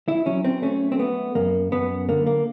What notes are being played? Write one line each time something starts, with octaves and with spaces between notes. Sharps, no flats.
E4
F#3 C#4
C4
A3 C#4
C4
A3 B3
F#2 A#3
F#2 B3
D3 A#3
A#3